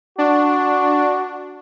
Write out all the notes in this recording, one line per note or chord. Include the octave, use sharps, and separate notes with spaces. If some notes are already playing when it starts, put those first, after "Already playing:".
D4 F#4